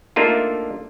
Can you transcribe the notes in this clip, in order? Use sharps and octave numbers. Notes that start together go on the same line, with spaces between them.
A3 A#3 D4 D#4 F4